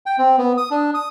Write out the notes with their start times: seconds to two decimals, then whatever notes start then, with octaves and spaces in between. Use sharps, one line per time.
0.06 G5
0.18 C4
0.38 B3
0.57 D#6
0.71 D4
0.94 D#6